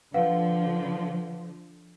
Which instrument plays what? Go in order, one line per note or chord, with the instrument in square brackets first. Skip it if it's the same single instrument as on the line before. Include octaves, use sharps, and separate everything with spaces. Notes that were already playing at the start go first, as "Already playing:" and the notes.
[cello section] D3 F3 [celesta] B4 F5 F#5